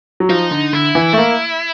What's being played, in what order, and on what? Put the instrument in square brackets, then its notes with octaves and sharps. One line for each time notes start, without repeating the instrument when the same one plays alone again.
[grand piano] F#3
[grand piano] F3 [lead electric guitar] D#4
[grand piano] D3
[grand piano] D3 [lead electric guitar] E4
[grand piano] E3
A3
A#3